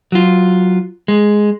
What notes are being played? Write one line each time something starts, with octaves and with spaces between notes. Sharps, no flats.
F#3 F4
G#3